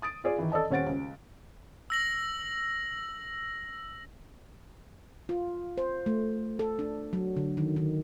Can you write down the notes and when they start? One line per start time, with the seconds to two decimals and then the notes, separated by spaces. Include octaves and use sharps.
0.02 D#6 A6 D7
0.24 F4 G#4 D5
0.38 D#3 E3
0.52 A4 D5 D#5 A5
0.70 D#1 C#4 C5 F#5 A6 D7
0.86 C#2
1.90 E6 A#6 F#7
5.29 F4
5.78 C5
6.06 A3
6.59 A4
6.79 D4
7.13 F#3
7.36 D3
7.57 D#3
7.76 D#3